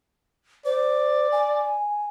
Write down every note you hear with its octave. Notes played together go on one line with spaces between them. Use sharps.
C5 D5
G#5